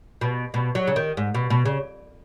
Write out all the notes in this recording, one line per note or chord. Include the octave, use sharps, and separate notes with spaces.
B2
B2
F#3
C#3
D#3
G#2
B2
B2
C#3